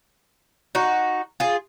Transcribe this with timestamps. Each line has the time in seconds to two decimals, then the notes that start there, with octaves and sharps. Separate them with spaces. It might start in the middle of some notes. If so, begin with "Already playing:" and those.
0.75 D#4 F#4
1.40 F4 G#4